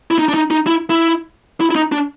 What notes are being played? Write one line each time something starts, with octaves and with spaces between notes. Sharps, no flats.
E4
D#4
D4
D#4
D#4
E4
E4
E4
E4
D#4
D4